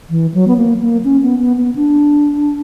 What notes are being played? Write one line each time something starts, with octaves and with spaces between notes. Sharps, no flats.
E3
F#3
B3
A#3
A#3
C#4
B3
B3
B3
D4